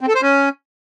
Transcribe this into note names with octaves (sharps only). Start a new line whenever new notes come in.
C4
A4
C5
C#4